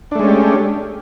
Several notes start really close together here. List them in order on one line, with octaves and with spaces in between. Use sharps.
D4 A3 G#3 C#4 G4